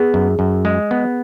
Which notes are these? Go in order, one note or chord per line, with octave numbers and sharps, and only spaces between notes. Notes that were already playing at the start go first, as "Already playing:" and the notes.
Already playing: B3 G#4
F#2
F#2
G#3
B3